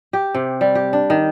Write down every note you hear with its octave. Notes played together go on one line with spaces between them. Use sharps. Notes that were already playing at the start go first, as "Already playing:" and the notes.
G4
C3
G3
G4
D4
D#3